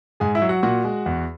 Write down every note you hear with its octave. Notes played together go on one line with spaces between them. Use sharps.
G#2 G#4 G#5
E4 E5
F#3
F#4 F#5
A#2 F#4 F#5
G#3
E2